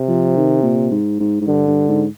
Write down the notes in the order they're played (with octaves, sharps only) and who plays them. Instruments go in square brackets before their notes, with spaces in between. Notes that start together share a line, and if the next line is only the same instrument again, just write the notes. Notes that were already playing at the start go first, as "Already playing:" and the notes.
Already playing: [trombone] C3
[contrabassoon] F3
D#3
A#2
G#2
G#2
G#2
[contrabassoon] G2 [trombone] D3
[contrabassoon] G2
G#2